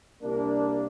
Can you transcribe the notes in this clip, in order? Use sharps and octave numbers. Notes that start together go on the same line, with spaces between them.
C2 A#3 D4